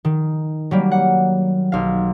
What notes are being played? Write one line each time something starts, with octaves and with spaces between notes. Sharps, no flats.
D#3
F#3 G3 A#3
F#5
B1 F5